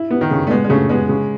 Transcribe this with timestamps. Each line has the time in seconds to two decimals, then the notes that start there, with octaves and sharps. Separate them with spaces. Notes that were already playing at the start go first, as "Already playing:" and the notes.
Already playing: E4
0.11 B3
0.21 D#3
0.31 C#3
0.47 A3
0.50 G#3 B3
0.64 G#3
0.70 C#3 A3
0.89 G#3 B3
1.09 C#3